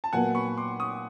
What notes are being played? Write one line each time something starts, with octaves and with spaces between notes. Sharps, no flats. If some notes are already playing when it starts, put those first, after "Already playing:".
A5
A#2 F#3 B3 F#5 G#5
B5 C#6
C6 D6
C#6 D#6